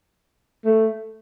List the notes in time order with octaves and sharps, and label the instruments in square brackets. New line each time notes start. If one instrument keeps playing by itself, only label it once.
[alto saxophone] A3